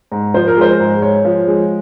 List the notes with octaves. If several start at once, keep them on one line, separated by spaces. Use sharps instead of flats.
G#2
F3 C5
A#4
G#3 C5
G#2
G#3 C#5
F3
G#3